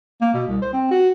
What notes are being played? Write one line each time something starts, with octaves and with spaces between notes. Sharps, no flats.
A#3
B2
C2
C5
C4
F#4